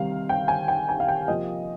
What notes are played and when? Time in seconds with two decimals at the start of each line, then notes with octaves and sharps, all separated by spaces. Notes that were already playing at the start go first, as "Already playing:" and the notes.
Already playing: C3 D#3 G3 C4 F5
0.29 G5
0.48 G#5
0.68 G5
0.89 G#5
1.00 F5
1.08 G5
1.28 C3 F3 A#3 D#5